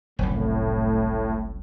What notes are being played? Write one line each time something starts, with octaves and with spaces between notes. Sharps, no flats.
F#1 C2 A2